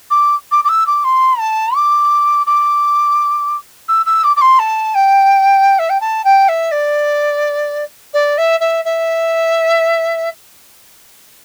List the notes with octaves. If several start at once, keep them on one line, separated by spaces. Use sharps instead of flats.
D6
D6
D6
E6
D6
C6
A5
D6
D6
E6
E6
D6
D6
C6
A5
G5
E5
G5
A5
G5
E5
D5
D5
E5
E5
E5